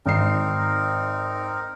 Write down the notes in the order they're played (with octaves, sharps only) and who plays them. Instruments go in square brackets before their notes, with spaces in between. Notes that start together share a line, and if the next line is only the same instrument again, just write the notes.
[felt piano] G#1 C7 [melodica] C4 D#4 A#4